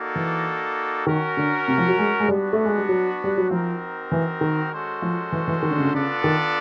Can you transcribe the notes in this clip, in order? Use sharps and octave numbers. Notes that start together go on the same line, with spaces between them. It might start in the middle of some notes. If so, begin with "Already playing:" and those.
Already playing: A#3 D#4 F#4 A4 D5
E3
D#3 C#4 F#4 A#4
D3
C3
F3
F#3
G#3
G#3
G3 B3 D4 F#4
A3
G#3
G3
F#3
G3
F#3
F3 C4 D#4 F#4 A#4
E3
D#3
G#3 C#4 F#4 A4 C5
F3
E3
E3
D#3
D3
C#3
D3
C#3 B3 D4 F4 A4 D5
D#3